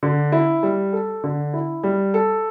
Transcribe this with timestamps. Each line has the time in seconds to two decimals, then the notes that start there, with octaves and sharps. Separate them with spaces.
0.03 D3
0.32 E4
0.63 G3
0.93 A4
1.24 D3
1.54 E4
1.83 G3
2.14 A4